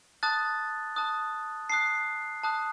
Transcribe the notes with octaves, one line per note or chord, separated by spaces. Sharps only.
A5 D#6 F#6 A6
A5 D#6 F#6
A5 D#6 F#6 C7
A5 D#6 F#6